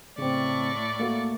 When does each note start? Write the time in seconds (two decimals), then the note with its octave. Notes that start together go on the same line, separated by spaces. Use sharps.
0.18 A2 C#3 C4 D5 C#6
1.00 A3 A#3 F#4